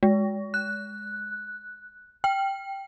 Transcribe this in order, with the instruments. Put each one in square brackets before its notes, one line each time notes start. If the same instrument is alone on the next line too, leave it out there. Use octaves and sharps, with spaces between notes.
[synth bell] G#3
F#6
G5